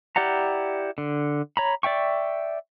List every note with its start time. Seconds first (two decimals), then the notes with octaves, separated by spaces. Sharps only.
0.16 E4 G4 D5 F#5 A#5
0.98 D3
1.57 C#5 A#5 B5
1.83 D5 E5 G5 C#6